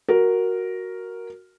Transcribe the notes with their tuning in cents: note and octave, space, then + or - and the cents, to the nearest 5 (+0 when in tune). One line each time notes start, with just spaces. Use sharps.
F#4 +0 A#4 +0